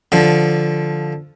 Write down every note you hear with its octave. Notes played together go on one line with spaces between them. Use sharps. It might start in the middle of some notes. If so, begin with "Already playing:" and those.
D3 F3